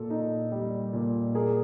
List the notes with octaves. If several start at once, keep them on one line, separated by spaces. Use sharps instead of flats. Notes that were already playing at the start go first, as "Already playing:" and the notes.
Already playing: A#2 A4
D#4
G3
A#2
A#3 G#4